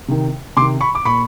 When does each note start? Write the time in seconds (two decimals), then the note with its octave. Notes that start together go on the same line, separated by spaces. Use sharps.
0.08 C3 D#3
0.57 C3 C6 D6
0.61 D#3
0.81 B5 C#6
0.95 D6
1.05 A#2 B5 C#6